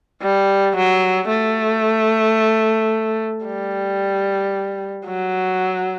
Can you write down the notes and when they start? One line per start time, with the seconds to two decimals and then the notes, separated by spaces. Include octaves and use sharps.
0.22 G3
0.76 F#3
1.29 A3
3.45 G3
5.06 F#3